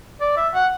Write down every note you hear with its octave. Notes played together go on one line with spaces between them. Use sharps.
D5
E5
F#5